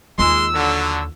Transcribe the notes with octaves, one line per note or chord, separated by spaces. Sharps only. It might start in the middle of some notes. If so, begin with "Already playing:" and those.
D#2 G#3 F4 C6 E6
D3 F#3